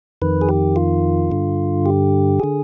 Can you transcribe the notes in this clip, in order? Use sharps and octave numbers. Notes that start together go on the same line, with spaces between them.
F2 D#3 B4
G#4
G4
F4
G2 D3
G4
D3 G#4